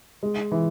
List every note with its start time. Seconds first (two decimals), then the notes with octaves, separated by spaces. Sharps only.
0.23 G#3
0.52 E3